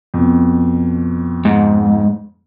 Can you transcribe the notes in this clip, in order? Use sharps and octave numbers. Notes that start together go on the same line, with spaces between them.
F2 B2
G#2